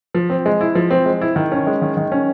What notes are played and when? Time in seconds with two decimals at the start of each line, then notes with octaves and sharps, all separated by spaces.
0.14 F3
0.30 C4
0.46 G#3
0.61 E4
0.75 F3
0.91 C4
1.06 G#3
1.21 E4
1.36 D#3
1.52 C#4
1.67 G#3
1.82 D#3
1.97 D#3
2.12 C#4